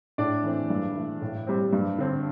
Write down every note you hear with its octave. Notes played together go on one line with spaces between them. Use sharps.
A2 D4 D5
E3 A3 C4
G2
E3 A3
A2
G3 C4
G2
D3 C4